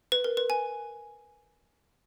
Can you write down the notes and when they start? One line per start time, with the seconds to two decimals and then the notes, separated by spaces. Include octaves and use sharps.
0.12 B4
0.24 A#4
0.37 B4
0.50 G#5